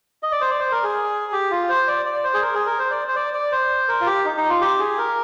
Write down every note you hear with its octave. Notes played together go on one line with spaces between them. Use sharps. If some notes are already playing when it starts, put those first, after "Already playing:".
D#5
D5
C5
D5
C5
A#4
G#4
G4
F4
C5
D5
D5
C5
G#4
A#4
G#4
A#4
C5
D5
C5
D5
D5
C5
A#4
F4
G4
D#4
D#4
F4
G4
G#4
A#4